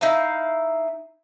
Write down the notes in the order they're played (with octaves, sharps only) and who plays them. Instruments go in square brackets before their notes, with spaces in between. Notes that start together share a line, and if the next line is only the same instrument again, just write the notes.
[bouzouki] D#4 E4 F5 A#5